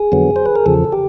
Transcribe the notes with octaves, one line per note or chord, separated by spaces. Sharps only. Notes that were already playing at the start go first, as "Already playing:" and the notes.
Already playing: G#4
F2 D3 F#3 B3
C5
B4
A#4
E2 C#3 F3 A4
G4